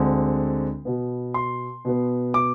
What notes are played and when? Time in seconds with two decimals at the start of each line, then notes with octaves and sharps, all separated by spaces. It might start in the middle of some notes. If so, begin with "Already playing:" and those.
Already playing: D2 D3 G#3 C4
0.85 B2 B3
1.34 C6
1.85 B2 B3
2.34 D6